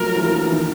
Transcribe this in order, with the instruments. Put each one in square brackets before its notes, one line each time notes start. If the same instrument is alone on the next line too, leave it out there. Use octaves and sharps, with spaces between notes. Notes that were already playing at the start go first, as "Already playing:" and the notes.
Already playing: [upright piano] F3 F#3 A3 A#3 C#4 [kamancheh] A#4
[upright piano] E3
F3
E3
D#3